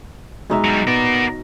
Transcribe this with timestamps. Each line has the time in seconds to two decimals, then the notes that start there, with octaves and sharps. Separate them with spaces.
0.50 B2 G#3 D#4 E5
0.64 F#3 G3
0.87 B3 A#4 D5